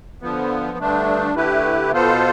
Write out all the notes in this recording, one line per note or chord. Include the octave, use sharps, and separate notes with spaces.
D3 F3 B3
G2 D3 A3 D4
D3 A3 E4 G4 B4
B2 B3 F4 A4 C5